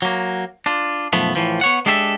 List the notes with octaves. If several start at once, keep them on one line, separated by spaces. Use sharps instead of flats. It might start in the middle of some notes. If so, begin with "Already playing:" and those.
F#3 A#3
D4 F4
B1 F#2 F3 A3 B3
A2 E3 F3
B3 C#5 F#5
G#3 D4 G4 A4 C5 E5